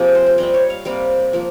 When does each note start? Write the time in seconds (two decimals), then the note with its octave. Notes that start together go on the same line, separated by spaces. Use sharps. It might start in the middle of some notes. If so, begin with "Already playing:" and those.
Already playing: C3 F3 A#3 G#4
0.15 C5
0.26 C5
0.38 C3 G3 C4 D#5
0.54 C#5
0.70 F5
0.85 C3 G3 A#3 F5
1.33 F3 A#3